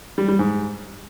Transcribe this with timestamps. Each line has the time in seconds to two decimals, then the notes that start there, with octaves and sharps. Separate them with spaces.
0.18 G3
0.28 G3
0.39 G#2